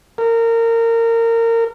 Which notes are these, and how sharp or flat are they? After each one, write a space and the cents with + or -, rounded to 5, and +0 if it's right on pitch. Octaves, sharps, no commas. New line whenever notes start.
A#4 -25